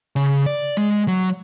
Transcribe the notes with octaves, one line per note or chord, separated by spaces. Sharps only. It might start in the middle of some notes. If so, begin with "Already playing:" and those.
C#3
D5
G#3
F#3